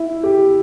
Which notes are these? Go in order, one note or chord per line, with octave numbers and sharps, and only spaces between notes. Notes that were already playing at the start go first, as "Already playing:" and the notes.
Already playing: E4
G4